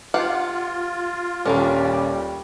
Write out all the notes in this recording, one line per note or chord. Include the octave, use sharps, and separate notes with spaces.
F4 G4 F5 F#5
D#1 G3 C#4 D4 A4 A#4